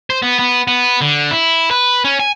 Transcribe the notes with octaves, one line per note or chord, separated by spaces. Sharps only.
C5
B3
B3
B3
D3
E4
B4
C#4
G#5